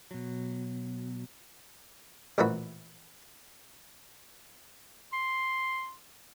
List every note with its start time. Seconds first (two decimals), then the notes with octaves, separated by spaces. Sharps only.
0.11 B2 F#3
2.38 A1 A#2 E3 F3 F#4 B5
5.13 C6